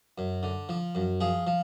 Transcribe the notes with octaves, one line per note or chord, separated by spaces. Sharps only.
F#2
D3
F3
F#2
F3 G#4
F3